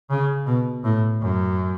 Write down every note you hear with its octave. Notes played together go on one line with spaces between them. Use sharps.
C#3
B2
A2
F#2